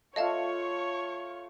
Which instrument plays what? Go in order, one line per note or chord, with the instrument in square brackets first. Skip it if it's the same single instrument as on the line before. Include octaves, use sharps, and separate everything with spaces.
[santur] A3 F4 [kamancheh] C#5 C#6 [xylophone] D#5 F5 A5